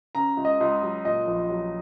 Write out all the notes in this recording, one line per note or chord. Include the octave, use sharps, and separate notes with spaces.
C#3 A#5
C#2
D#5
C#2
F#3
A#2 D#5
A#1
F#3